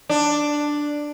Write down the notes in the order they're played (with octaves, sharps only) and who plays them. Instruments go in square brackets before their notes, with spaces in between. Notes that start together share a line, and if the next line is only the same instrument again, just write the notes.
[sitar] D4